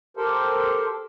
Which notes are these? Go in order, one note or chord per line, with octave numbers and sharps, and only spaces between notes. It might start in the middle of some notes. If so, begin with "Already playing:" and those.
G4 A4 A#4 C5